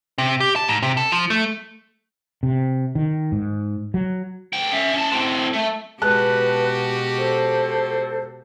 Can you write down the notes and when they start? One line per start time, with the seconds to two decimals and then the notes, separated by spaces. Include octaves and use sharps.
0.18 C3
0.40 G4
0.56 A5
0.69 G#2
0.82 C3
0.97 A4
1.12 F3
1.30 A3
2.43 C3
2.95 D#3
3.32 G#2
3.94 F#3
4.53 D2 G5
4.73 C#4 E5
4.93 C#4 A5
5.11 A2 C4
5.53 A3
6.02 B2 G#3 F#4 G4 B4 A5 F#6
7.18 A4 C5